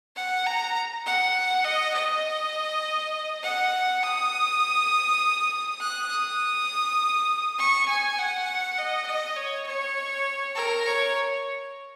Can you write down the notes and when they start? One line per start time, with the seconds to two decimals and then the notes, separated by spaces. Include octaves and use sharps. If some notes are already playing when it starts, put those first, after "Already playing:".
0.16 F#5
0.46 A#5
1.06 F#5
1.64 D#5
1.94 D#5
3.43 F#5
4.03 D#6
5.80 F#6
6.10 D#6
7.59 C#6
7.88 G#5
8.19 F#5
8.78 D#5
9.07 D#5
9.36 C#5
9.67 C#5
10.55 A#4
10.86 C#5